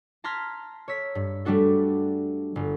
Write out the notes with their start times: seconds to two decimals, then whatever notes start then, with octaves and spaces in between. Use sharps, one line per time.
0.24 A5 A#5 C6 F6 G#6 B6
0.88 C#5 E6 B6
1.15 G2
1.45 G3 A3 D4 F#4 A4
2.56 G1